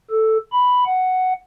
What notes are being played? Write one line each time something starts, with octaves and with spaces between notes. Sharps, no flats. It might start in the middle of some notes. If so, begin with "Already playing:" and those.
A4
B5
F#5